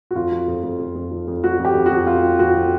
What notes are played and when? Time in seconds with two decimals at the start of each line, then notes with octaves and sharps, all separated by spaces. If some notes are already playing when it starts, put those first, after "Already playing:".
0.11 F#4
0.15 F2 F4
0.32 F3
0.48 F2
0.63 F2
0.79 F2
0.96 F2
1.11 F3
1.28 F2
1.44 F3 F#4
1.59 F2
1.65 G4
1.75 F2
1.86 F#4
1.91 F2
2.07 F3 F4
2.23 F3
2.39 F2 F#4
2.55 F3